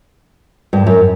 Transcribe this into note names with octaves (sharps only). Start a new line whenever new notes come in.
G2
F#2